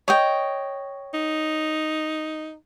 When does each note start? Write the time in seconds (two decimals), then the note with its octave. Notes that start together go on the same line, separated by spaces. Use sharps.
0.08 C#5 D#5 G5
1.14 D#4